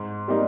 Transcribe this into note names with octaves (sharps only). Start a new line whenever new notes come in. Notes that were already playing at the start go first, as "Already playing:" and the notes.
Already playing: G#2
G3 A#3 D#4